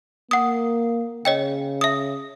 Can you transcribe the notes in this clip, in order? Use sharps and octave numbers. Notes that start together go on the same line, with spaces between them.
A#3 F#5 D#6
C#3 C#5 D#5 G5
E5 D#6